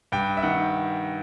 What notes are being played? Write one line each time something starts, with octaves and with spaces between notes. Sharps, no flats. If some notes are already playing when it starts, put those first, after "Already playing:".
G2 G5
E5
D#3 F#5